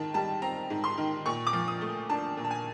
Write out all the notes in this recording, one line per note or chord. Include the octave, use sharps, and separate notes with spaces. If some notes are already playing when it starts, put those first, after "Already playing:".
Already playing: G#2 D#3 A5
G3 A5
C4 A#5
G#2
C6
D#3
A#2 C#6
D6
F3
D#6
A3
D4 A5
A#2
A5
G#5